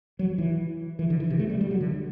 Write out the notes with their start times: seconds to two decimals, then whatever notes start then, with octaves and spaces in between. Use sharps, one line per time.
0.19 F#3
0.38 E3
0.99 E3
1.10 D3
1.20 E3
1.30 C3
1.39 A3
1.50 G3
1.61 G3
1.71 F#3
1.81 D3